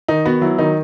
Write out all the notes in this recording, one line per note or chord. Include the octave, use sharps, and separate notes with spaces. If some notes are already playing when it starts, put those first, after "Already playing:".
D#3 D#4
B3 F#4
F#3 E4
D#3 D#4